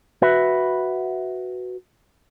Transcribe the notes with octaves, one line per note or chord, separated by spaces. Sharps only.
F#4 B4 E5